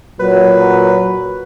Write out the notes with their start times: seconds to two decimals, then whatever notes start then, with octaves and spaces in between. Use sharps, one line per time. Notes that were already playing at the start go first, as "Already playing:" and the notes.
0.20 A#2 F#3 B4